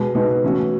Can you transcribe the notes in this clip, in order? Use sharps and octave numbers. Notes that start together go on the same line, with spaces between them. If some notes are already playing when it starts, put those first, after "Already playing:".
Already playing: B2 G#3 B3
B2 G#3 B3 D#4
E3 A3 C#4 F#4